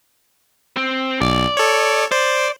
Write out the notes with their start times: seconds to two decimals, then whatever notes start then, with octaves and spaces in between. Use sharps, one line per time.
0.77 C4
1.21 B1 D5
1.57 A4 C#5
2.12 C5 D5